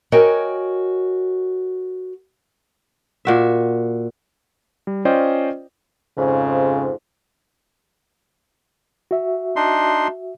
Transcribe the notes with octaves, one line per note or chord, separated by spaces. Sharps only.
F#4 A#4 C#5 D#5 G5 G#5
A#2 F#4 E5
G3
C#4 F4 C5 D5 D#5 G5
F2 G#2 C#3
F#4 E5
D4 D#4 C6